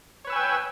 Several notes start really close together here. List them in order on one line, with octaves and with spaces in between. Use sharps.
C#5 B4 E6 G#5 G5